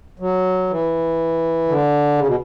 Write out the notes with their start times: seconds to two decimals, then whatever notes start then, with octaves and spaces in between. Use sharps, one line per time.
0.20 F#3
0.70 E3
1.68 D3
2.19 C#3
2.27 B2